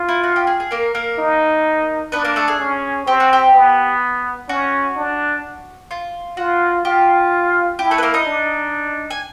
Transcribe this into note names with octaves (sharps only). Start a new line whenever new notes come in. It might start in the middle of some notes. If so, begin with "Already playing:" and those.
Already playing: F4
E4
F#4
G4
G#4
G#4
A#3 A#4
A#3 A#4
D#4
B3 D4 B4
A#3 A#4
A3 A4
G#4
C#4
C4 G4
F#4
G4
B3
C#4 F#4
D4
F4
F4 F#4
F4 G4
E4 G4
A3 A4
B4
A#3 A#4
D#4 D#5
D4
G#5